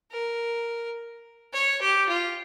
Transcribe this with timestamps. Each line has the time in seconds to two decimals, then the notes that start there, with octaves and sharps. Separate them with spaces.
0.11 A#4
1.53 C#5
1.81 G4
2.09 F4